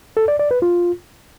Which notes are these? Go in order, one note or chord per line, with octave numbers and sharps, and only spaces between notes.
A4
D5
D5
B4
F4